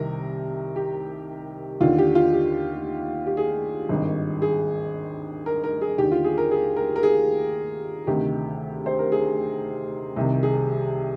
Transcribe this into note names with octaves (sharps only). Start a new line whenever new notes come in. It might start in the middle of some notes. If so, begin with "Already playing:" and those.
Already playing: C2 C3 D#3 A#4
G4
D#2 D3 F4
G4
F4
G4
G4
G#4
G#1 G2 D#3
G#4
A#4
A#4
G#4
D#2 D3 G4
F4
G#4
A#4
G#4
A#4
A#4
G#4
D2 C3 D#3 G4
C5
A#4
G#4
C2 C3 D#3
G#4